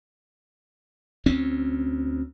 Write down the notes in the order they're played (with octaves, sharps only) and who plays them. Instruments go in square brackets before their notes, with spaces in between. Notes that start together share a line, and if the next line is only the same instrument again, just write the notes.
[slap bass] D2 C4 C#4